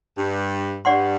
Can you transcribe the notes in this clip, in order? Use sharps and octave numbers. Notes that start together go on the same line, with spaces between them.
G2
G2 G4 D5 F#5 C6